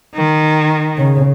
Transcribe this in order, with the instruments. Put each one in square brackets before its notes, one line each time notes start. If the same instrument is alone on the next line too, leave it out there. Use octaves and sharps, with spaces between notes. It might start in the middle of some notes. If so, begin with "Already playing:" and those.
[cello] D#3
[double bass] C#3